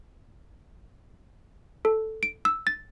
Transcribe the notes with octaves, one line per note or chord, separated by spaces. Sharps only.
A4
D7
E6
A6